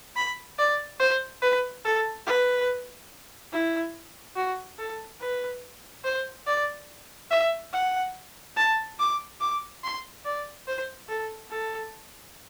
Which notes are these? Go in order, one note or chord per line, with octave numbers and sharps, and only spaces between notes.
B5
D5
C5
B4
A4
B4
E4
F#4
A4
B4
C5
D5
E5
F#5
A5
D6
D6
C6
D5
C5
A4
A4